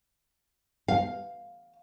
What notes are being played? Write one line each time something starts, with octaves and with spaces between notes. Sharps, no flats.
F5